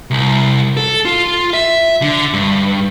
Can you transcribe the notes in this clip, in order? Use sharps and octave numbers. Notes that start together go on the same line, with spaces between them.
C2
A4
F4
E5
D3
G2